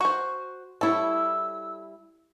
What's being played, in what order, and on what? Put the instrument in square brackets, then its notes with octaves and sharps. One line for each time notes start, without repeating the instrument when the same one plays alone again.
[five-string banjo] F#4 C5 [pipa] C#6
[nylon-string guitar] G3 E4 [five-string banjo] A4 C#5 [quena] E6